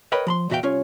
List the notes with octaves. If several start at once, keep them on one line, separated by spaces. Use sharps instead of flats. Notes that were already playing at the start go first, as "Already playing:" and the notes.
A#4 B4 C#5 D#5 G5 B5
F3 B5 C6
E2 A#2 F#4 E5 F5 G5
C2 C#4 F4 C#5